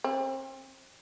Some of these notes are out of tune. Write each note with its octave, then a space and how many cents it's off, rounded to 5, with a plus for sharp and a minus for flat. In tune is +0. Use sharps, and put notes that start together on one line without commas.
C4 +35